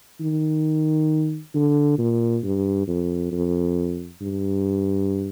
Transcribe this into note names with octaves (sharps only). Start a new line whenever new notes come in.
D#3
D3
A#2
G2
F2
F2
G2